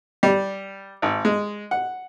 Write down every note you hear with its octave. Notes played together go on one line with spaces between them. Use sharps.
G3
G#1
G#3
F#5